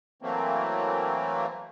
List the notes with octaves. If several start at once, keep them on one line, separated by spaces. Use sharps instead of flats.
E3 F#3 A3 A#3 C4